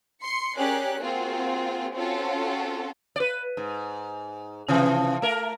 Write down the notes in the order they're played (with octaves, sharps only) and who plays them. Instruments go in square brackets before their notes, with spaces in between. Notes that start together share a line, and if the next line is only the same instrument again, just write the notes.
[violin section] C6 C#7
C#4 G4 G#4 A#4 D5 F#6
A#3 C4 F4 F#4 G#4
C4 C#4 F4 F#4 A4 C#5
[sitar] B4 D5
G#2
C3 E3 F3
A3 A#4